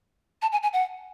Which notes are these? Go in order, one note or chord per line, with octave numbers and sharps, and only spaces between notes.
A5
G#5
G#5
F#5